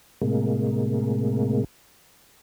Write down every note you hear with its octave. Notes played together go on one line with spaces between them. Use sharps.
A2 C3 G#3 A#3